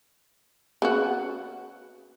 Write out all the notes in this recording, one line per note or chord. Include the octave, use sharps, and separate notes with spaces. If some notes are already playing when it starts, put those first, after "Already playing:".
C#3 B3 F#4